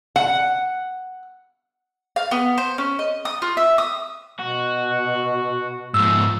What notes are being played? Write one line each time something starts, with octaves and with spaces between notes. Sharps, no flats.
F#5
F5
B3
C5
C#4
D#5
D#6
F4
E5
D#6
B2 F#4
G#2 F3 E6